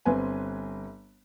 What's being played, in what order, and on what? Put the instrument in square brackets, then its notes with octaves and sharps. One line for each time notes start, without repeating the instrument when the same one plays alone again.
[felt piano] G1 C4 B4 G#5